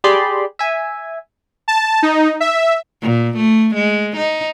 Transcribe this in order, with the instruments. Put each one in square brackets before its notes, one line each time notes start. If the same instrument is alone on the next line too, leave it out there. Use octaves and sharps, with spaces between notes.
[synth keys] G4 G#4 D5 B5 C6
E5 G#5
[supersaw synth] A5
D#4
E5
[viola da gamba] A#2
A3
G#3
D#4